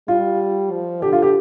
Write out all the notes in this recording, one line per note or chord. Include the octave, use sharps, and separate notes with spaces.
G3 F4
F3
D3 G4
F4
G4